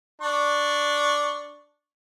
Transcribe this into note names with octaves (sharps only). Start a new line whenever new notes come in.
D4 C#6